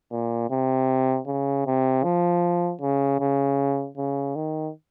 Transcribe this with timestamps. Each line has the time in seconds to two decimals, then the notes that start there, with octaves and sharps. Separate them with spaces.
0.11 A#2
0.50 C3
1.27 C#3
1.66 C3
2.04 F3
2.81 C#3
3.20 C#3
3.98 C#3
4.36 D#3